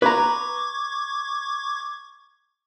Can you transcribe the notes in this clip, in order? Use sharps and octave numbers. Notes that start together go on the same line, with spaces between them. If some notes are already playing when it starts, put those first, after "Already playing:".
B4 A#5 C#6 D6 G#6